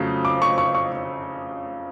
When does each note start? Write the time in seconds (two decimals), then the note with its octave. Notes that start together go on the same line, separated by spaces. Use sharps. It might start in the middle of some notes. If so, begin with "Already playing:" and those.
Already playing: F2 C#3 F#3 A3
0.25 D6
0.42 C#6
0.58 C#6
0.75 C#6